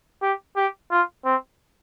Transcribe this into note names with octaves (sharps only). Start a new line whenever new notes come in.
G4
G4
F4
C4